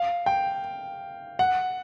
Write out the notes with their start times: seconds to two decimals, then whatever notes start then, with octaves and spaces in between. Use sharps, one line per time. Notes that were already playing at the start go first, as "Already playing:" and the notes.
Already playing: F5
0.26 G5
1.39 F#5